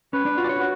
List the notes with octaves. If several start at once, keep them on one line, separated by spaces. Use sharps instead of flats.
C#4 B4
D4
F4 F#4
D5
C#5
F#4